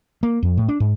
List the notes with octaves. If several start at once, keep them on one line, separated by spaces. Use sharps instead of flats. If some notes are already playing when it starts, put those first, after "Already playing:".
A#3
F2
A2
D4
G#2